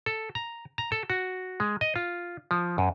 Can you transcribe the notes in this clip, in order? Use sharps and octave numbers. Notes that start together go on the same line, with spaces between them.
A4
A#5
A#5
A4
F#4
G#3
D#5
F4
F3
F#2